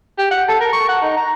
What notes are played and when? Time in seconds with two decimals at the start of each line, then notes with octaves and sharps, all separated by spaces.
0.18 G4
0.31 F#5
0.48 A4
0.60 A#4
0.73 C#6
0.88 F#5
1.02 D#4
1.17 A#5